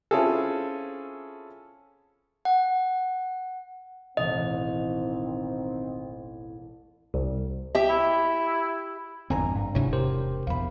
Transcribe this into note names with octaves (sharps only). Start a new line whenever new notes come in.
C4 C#4 E4 F4 G#4 A4
F#5
E1 A1 D#3 C4 D#5
C2
G4 E5
E4
G#1 F2 D3 C4 G#5 A#5
G2
E1 G#2 C3 D4 E4 C#5
G4 A#4 C5
A#1 E2 F5 B5